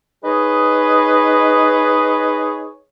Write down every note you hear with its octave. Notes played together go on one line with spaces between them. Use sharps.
D#4 G#4 B4 C#5 D#5